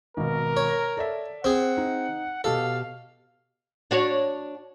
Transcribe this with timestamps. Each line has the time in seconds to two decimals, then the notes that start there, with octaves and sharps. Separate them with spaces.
0.17 G#1 B2 A#4
0.57 C#5
0.97 A4 D5 E5
1.44 C4 G#4 F#5
1.77 D#4
2.44 B2 G4 A4 F5 A5
3.91 D4 F#4 C#5